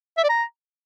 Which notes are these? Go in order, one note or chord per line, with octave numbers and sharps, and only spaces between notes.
E5
D5
A#5